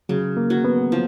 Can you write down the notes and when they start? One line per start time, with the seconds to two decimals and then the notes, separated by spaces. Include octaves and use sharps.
0.09 C#3 F#3
0.37 A#3
0.50 F#3
0.65 B3
0.92 F3